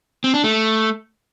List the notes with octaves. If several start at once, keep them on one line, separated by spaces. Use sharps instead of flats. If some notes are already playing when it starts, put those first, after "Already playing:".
C4
D4
A3